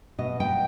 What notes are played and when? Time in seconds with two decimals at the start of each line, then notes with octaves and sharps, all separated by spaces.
0.18 B2 D#5
0.40 B3 G5